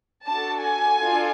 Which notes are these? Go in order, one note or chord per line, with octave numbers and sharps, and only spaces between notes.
D4 F#4 A4 A5
G#5
D4 F4 A4